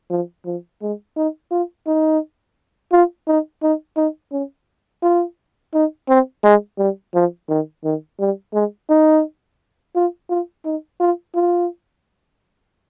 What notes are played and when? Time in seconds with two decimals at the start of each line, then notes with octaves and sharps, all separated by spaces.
0.10 F3
0.45 F3
0.82 G#3
1.17 D#4
1.51 F4
1.87 D#4
2.92 F4
3.27 D#4
3.63 D#4
3.97 D#4
4.32 C#4
5.03 F4
5.74 D#4
6.09 C4
6.44 G#3
6.78 G3
7.14 F3
7.49 D#3
7.84 D#3
8.19 G3
8.54 G#3
8.89 D#4
9.95 F4
10.29 F4
10.65 D#4
11.00 F4
11.35 F4